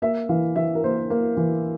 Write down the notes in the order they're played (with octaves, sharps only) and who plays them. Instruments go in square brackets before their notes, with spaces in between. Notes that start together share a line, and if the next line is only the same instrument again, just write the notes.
[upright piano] A#3 E5
E3 F5
E3 E5
A#4
A#3 C5
A#3
E3